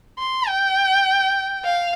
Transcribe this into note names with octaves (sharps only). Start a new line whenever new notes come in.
C6
G5
F5